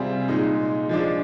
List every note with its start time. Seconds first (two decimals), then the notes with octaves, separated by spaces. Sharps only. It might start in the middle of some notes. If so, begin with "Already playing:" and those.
Already playing: C3 G3 C4 F4 G#4
0.28 A#2 G#3 D#4
0.89 F3 G#3 D4